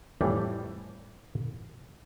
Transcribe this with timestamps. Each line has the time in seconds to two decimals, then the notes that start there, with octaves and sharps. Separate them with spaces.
0.21 F2 A2 E3 G3